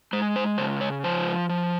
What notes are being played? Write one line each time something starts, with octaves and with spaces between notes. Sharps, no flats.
G#3 C5
C5
C#3 C5
C#5
F3 C5
F3